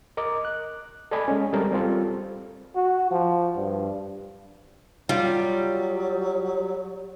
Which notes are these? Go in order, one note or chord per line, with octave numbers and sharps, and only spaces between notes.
A#4 D#5 D6
F#6
A4 D5 D#5 G#5 B5
G#3 C#4
G3 G#3 C4 A4 A#4
G3 C4 F4 A4
F#4
F3
G2
F#3 G3 F4